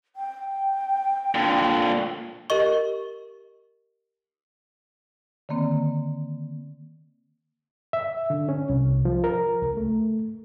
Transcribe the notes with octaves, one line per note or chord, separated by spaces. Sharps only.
G5
A#2 D3
G4 A#4 D#5 C#6
D3 D#3 A#3 C4
E5
D3
C#4
C2
F3
A#4
C#2
A3